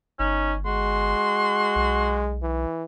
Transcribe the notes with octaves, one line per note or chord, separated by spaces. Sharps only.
G1 C#4 D#4
G#3 F#4 C6
B1
E3